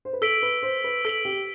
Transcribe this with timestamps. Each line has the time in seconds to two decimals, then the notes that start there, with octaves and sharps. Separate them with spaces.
0.05 C5
0.13 B4
0.21 A4 E6 B6 D7 F#7
0.42 B4
0.63 C5
0.84 B4
1.05 A4 E6 B6 D7 F#7
1.25 G4